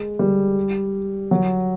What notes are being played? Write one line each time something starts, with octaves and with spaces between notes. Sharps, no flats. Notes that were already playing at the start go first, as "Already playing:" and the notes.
Already playing: G#3
G3
F#3